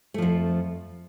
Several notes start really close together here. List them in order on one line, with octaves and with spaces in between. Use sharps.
A3 F3 F2